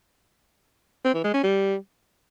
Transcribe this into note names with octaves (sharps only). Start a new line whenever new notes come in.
C4
E3
G#3
C#4
G3